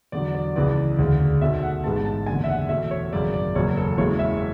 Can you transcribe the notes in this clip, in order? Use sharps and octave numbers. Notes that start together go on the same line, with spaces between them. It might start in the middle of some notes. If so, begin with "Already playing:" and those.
E2 D3 F#3 D5
D5
C#2 C#3 E3 B3 D5
E1 D2 C#3
B1 B2 A3 E5
F#5
A1 G#2 G#3 B3 A5
A5
F#1 E2 D3 G#5
E5
F#5
E2 B2 A3 E5
C#5
G#1 F#2 C#3 D5
D5
F#1 E2 B2 F#3 C#5
A4
F#1 E2 C#3 E3 G#3 C#5
E5